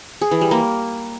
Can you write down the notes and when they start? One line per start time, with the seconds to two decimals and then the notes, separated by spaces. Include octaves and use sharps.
0.21 G#4
0.31 E3
0.41 G3
0.51 A#3